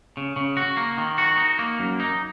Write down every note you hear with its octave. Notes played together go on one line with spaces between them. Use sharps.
C#3
C#3
F#4
A#3
D#3
F#4
D#4
A#3
F#2
D#4